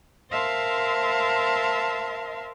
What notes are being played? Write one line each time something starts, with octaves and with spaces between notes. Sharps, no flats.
A#4 C5 E5 F5 A5 C6